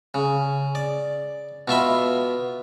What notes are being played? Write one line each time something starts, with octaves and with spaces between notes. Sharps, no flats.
C#3
D5
B2 F4 E5 B5